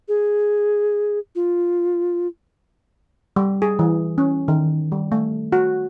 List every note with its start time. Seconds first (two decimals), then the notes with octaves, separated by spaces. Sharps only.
0.08 G#4
1.35 F4
3.36 G3
3.62 G#4
3.79 E3
4.18 C#4
4.48 D#3
4.92 G3
5.12 A3
5.52 F#4